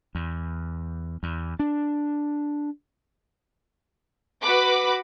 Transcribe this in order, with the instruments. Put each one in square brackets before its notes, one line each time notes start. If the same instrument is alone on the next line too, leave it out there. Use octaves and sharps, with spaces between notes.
[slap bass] E2
E2
D4
[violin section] F#4 B4 B5 D6